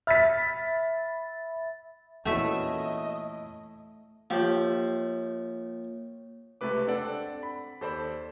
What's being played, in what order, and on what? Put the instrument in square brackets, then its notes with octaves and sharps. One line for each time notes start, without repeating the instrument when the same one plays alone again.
[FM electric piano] E5 B5 A6 [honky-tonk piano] F6 B6
[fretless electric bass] E2 A#2 [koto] A3 E5 [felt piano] C#4 E4 F#4 [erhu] D#5
[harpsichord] F3 G4 [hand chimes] A#3 C#5
[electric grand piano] C#2 C3 A3 B4 D6
C4 D4 A4 D5 F#5
B5
D#2 A4 C5 D5 B5